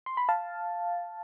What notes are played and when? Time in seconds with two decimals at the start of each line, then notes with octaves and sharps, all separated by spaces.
0.06 C6
0.17 B5
0.29 F5 A5